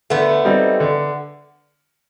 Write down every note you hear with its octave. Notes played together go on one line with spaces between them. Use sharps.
D3 A3 B3
G3 C4 D#4
D3